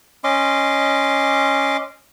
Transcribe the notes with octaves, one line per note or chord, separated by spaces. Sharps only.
C#4 D#5 C6 D6